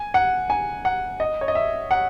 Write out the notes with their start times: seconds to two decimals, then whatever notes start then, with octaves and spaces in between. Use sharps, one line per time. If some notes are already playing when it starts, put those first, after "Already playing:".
Already playing: G#5
0.14 F#5
0.50 G#5
0.85 F#5
1.20 D#5
1.41 C#5
1.48 D#5
1.55 E5
1.91 F#5